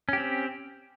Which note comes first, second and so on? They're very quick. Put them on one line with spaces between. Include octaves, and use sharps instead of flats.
C#4 G4 C4